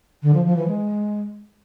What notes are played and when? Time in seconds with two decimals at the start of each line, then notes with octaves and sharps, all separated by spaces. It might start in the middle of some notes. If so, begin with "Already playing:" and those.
0.23 D3
0.34 F3
0.45 F3
0.57 E3
0.68 G#3